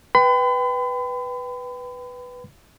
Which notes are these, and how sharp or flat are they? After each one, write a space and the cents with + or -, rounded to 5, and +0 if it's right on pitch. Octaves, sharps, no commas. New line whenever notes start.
B4 +0 G5 +0 B5 +40